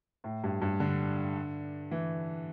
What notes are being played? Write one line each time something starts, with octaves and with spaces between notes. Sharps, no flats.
A2
G2
G2
D3
E3